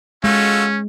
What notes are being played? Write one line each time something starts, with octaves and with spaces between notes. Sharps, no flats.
G#3 C#4 F4 F#4 A4